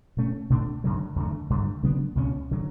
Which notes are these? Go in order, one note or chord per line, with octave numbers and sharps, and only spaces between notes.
B2 A3 C#4
B2 A3 D4
F#2 D3 F#3
E2 D3 A3
G2 D3 G3
C#3 F#3 B3 D4
C#2 B2 G3 C#4
D3 F#3